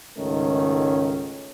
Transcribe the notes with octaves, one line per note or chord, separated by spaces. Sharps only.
C#2 G#2 D#3 A3 C#4